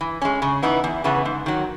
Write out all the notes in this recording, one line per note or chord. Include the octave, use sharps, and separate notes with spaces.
E3
G#3 C#4
C#3
E3 B3 D#4
E2
C#3 E3 B3
G#2
D#3 F#3